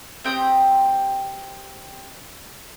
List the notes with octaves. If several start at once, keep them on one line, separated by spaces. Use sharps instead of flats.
C4 G4 G5 D#6